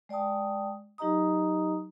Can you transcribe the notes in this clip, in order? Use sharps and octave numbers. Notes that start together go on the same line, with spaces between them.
G#3 D5 G5 A5 D#6
F#3 D#4 G4 D#5 A#5 D#6